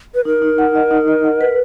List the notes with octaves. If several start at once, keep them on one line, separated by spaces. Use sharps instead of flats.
B4
D#4 A#4
D#4
F#5
D#5
D#4
D#5
F#5
B4